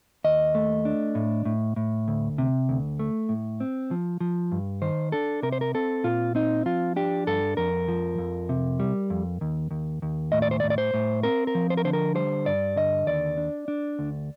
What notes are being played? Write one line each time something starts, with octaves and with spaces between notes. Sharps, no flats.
D#2 D#5
A3
D4
A2
A2
A2
D2
C3
D2
A3
A2
C4
F3
F3
G2
D#3 C5
D4 A4
C3 A#4
C5
A#4
C4 A4
A#2 F4
C4 D#4
F3 F4
D4 G4
G2 A4
F2 A#4
F3
F2
C3
G3
F2
D#2
D#2
D#2
A2 D#5
D5
C5
D5
A2
D5
C5
A2
C4 A#4
A#4
F3
C5
A#4
D3 C5
A#4
G3 C5
G2 D5
D3 D#5
D#2 D5
D4
D4
D2